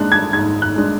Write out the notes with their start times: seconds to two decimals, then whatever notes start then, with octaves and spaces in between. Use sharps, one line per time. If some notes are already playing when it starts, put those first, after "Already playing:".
Already playing: G#2 G#3 D4 A5 F#6
0.12 G#6
0.33 G#2 G#6
0.62 F#6
0.76 G#3 D4